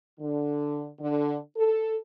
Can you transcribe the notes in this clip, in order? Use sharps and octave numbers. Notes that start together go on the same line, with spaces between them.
D3
D3
A4